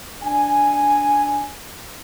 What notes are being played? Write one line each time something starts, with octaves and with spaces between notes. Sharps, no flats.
D4 G#5